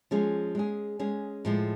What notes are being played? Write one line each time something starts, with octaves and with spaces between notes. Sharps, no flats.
F3 G#3 C#4 G#4
G#3 C#4 G#4
G#3 C#4 G#4
A2 F3 G#3